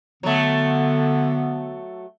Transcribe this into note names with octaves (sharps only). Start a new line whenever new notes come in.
D3 F#3 A3 B3